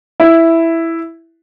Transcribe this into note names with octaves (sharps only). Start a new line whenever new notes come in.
E4